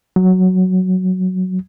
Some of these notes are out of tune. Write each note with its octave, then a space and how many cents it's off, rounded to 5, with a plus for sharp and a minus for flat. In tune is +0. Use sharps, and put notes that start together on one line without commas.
F#3 +0